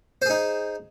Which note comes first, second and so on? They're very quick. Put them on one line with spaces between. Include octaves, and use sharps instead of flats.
C5 G#4 D#4